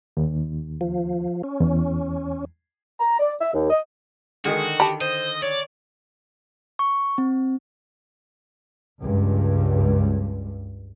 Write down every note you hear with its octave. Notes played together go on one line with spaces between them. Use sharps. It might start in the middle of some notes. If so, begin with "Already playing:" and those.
D#2
F3
C#4
E2
A#5
D5
E5
D#2
D#5
D3 D#3 G#3 F#4
G4 A5 B5
C5 D#5
C#5 D5
C#6
C4
C#2 G2